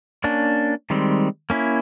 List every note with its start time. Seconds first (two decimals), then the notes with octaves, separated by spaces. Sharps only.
0.24 A#3 C#4 D4
0.90 D#3 G3 G#3 C4
1.50 A#3 C#4 E4